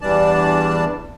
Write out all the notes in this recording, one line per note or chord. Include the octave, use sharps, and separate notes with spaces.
E2 E3 G3 D4 D5 A5